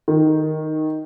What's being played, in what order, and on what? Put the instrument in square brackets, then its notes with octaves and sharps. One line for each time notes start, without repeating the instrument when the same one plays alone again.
[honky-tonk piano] D#3